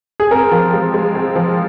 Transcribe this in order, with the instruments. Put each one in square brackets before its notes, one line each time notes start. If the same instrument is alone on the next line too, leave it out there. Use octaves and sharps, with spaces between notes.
[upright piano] G#4
[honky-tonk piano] C4 [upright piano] A#4
[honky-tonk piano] F3
G#3
G#3
C4
F3